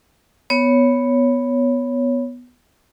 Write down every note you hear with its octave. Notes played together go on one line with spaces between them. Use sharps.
B3 C#5